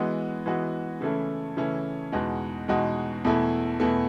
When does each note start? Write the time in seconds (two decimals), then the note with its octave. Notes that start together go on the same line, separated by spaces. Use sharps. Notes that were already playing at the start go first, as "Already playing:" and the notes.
Already playing: E3 G#3 B3 F#4
0.46 E3 G#3 B3 F#4
1.01 C#3 E3 A3 C#4 E4
1.57 C#3 E3 A3 C#4 E4
2.12 E2 B2 G#3 D#4 F#4
2.68 E2 B2 G#3 D#4 F#4
3.25 E2 B2 A3 E4
3.80 E2 B2 A3 E4